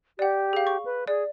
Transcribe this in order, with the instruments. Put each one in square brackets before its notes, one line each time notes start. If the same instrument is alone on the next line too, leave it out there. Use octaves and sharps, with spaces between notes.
[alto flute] G4 [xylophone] D5 F#5
[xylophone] G#4 F5
C#6
[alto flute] B4
[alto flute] G#4 [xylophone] D5